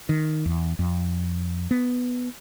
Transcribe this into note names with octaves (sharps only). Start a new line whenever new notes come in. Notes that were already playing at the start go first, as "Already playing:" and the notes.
D#3
E2
F2
B3